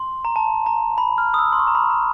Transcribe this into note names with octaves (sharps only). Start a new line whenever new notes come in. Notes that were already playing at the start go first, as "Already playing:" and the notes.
Already playing: C6
A#5
A5
A#5
B5
F6
D#6
E6
C6
C#6
A#5
B5
A#5